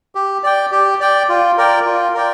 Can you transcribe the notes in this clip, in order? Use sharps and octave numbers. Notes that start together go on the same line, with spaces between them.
G4
D5 G5
G4
D5 G5
F4
A#4 D5 G5
F4
A#4 D5 G5